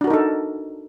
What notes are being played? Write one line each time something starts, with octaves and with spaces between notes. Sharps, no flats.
D4 D#4 F#4 A4 A#4